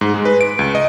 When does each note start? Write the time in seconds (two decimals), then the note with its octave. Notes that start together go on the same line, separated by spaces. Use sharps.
0.01 G#2
0.14 G#3
0.25 B4
0.41 D7
0.59 C#2
0.75 D#5